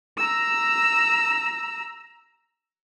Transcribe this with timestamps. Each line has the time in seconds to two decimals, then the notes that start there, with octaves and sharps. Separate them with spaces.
0.18 A#5 E6